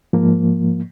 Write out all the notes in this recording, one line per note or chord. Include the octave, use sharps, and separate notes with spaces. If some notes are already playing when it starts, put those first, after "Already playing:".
G#2 F3 A#3